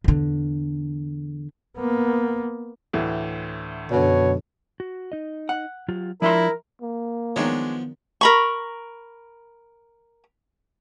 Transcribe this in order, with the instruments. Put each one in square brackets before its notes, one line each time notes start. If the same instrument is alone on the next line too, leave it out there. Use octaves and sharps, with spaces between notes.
[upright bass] E2 D3
[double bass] A#3 B3
[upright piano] D2 A2 E3
[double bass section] F#2 D3 [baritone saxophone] B2 [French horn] C#5
[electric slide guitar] F#4
D#4 D#5
[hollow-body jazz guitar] F#5
[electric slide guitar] F#3 F4 G4
[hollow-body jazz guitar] F3 E5 C6 [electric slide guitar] D4 F4 [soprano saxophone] E4 [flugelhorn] A#4
[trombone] A#3
[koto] D#3 F#3 [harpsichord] F3 B3 [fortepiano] G#3 D4 C#5
[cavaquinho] A#4 B5 C#6